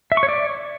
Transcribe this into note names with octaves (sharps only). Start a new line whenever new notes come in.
E5
C#6
C#5
D5